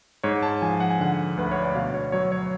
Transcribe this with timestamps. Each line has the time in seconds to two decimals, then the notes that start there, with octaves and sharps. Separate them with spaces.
0.23 G#2 C#5
0.43 A5
0.62 F3 G#5
0.80 F#5
0.90 G#5
0.99 D3 F#5
1.37 D2 B4
1.51 C#5
1.62 D5
1.75 B2 F5
1.94 C#5
2.12 F#3 C#5
2.32 C#5